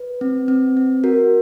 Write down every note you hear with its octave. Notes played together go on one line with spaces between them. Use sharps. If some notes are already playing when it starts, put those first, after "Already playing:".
Already playing: B4
C4
C4
C4
F#4 A#4